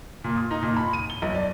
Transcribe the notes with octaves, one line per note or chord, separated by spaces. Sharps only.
A#2
D#6
D#4
A#2
B5
D#7
G7
B1
D5